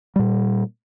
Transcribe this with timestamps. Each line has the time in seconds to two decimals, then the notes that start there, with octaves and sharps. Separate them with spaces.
0.16 A#2 G3